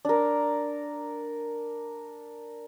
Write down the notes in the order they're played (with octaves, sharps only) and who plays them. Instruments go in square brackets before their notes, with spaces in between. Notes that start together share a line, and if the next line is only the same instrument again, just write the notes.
[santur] D4 A#4